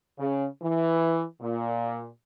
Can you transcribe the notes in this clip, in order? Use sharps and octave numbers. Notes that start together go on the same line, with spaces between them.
C#3
E3
A#2